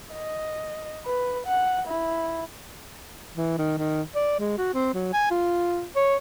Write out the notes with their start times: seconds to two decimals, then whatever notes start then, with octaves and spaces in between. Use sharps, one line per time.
0.14 D#5
1.05 B4
1.47 F#5
1.87 E4
3.37 E3
3.58 D#3
3.78 D#3
4.15 D5
4.39 G#3
4.58 F#4
4.74 C4
4.94 F#3
5.13 G#5
5.31 F4
5.96 C#5